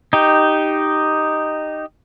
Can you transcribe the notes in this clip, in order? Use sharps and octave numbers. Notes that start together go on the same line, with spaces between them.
D#4 G4